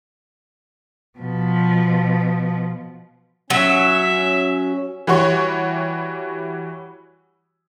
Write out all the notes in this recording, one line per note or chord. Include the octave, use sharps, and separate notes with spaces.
B2 F3
F#3 C#4 E5
E3 G3 F#4 C#5 C#6